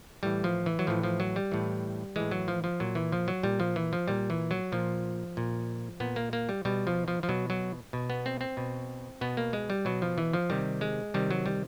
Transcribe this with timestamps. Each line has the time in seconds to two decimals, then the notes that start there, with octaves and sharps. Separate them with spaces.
0.23 A2 E3 G3
0.44 F3
0.66 E3
0.79 F#3
0.87 A2 E3 F3
1.03 F3
1.20 F#3
1.36 G3
1.52 A2 E3
2.16 A2 E3 G#3
2.31 F#3
2.48 F3
2.64 F3
2.80 A#2 F#3
2.95 E3
3.12 F3
3.28 F#3
3.43 A#2 G3
3.60 F3
3.76 E3
3.93 F3
4.08 A#2 G3
4.30 E3
4.51 F#3
4.72 A#2 F3
5.37 A#2
6.00 A#2 B3
6.16 A#3
6.33 A#3
6.49 G3
6.65 B2 G3
6.87 F3
7.08 F3
7.23 F3
7.29 B2 F#3
7.50 F#3
7.93 B2
8.10 B3
8.26 C4
8.41 C4
8.57 B2
9.21 B2 B3
9.37 A#3
9.53 G#3
9.70 G3
9.85 B2 F#3
10.02 F3
10.18 E3
10.33 F3
10.50 C3 D#3 G3
10.81 G#3
11.14 C3 D#3 G3
11.31 F#3
11.46 G3